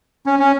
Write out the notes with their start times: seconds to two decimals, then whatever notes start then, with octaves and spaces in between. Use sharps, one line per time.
0.26 C#4
0.39 C#4